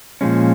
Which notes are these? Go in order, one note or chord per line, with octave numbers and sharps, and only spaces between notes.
A#2 F3 G#3 C#4